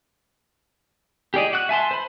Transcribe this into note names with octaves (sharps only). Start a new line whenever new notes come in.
G4 G#4 D5 D#5
F#4 F#6
E5 G#5 A5 C6
C5 B5